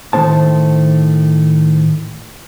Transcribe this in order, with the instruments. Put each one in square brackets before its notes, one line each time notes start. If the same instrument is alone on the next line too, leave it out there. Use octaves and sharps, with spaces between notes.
[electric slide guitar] A2 D#3 A3 B3 C5 A5